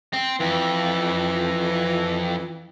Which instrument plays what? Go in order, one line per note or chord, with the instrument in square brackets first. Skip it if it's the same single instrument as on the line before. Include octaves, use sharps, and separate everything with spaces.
[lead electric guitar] C4
[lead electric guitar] F2 [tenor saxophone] E3